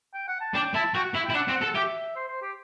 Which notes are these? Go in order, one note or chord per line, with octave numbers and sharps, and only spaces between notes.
G5
F#5
A5
D4 G5
E4 A5
F#4 G5
F#5
E4
E4 G5
D4 F#5
C4
F#5
A4
G4 E5
C5
C5
G4